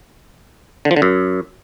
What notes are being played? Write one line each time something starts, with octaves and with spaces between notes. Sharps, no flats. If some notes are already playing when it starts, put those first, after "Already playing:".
D3
F3
D3
F#2